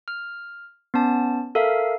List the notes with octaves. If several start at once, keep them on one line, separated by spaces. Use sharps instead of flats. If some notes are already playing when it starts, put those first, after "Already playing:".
F6
B3 C#4 A5
A4 A#4 E5 F5